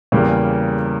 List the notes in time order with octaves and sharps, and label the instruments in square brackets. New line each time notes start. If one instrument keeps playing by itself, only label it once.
[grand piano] E2 C#3 G3 A#3